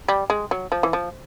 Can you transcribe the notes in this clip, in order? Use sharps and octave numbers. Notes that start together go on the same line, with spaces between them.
G3
G#3
F#3
F3
E3
F3